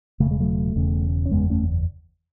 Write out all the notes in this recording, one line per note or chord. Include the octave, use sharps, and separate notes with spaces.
E1 E2 C#3 A3
G#3
F#3 A3
E1 E2 C#3
C#4
F#1 E2 C#3 G#3 B3
A3 C#4